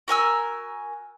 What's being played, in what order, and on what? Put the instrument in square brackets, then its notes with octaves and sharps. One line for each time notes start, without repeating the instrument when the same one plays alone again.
[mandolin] F#4 A#4 G#5 E6